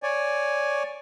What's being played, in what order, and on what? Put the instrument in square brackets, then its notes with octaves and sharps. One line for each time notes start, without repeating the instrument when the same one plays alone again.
[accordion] C#5 D5 G#5